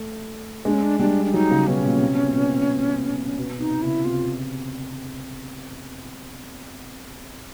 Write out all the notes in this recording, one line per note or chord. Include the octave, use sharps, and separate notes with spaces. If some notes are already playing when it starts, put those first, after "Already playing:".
Already playing: A3
G#3 D4
C#4
D4
G3 D4
D4
F#3 D#4
C#3
B2 C#4
A#2
C3
B2
A#2
B2
B2
C3 D#4
C#3 E4
C3 F4